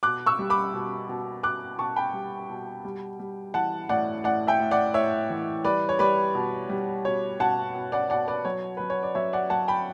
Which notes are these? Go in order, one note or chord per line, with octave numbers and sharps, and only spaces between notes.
B2 D6 F#6
C#6 E6
G3
B5 D6
B2
B2
B2 D6 F#6
B2 A5 C#6
G5 B5
G3
B2
G3
G3
E3 F#5 A5
A2 D5 F#5
A2 D5 F#5
E5 G5
A2
D5 F#5
A2 C#5 E5
E3
G3 B4 D5
C#5
G3 B4 D5
B2
G3
B2 C#5
B2 F#5 A5
B2
D5 F#5
B2 D5 F#5
B4 D5
F#3 C#5
F#3 B4
C#5
D5
F#3 C#5 E5
D5 F#5
F#3 F#5 A5
G5 B5